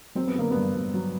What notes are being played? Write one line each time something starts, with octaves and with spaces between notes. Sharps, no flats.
F#3 C4
B3
D3 A#3
G2 B3
G2
F#3